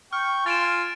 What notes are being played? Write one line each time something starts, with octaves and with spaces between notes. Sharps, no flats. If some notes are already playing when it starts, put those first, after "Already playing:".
G5 C#6 F6
F4 G#5 F6 A6 D7 E7